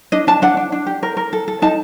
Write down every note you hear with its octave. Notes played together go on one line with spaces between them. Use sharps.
D4 D#5
D4 A5
D4 F#5
D4
D4
G4
A#4
A#4
A4
A4
D#4 A5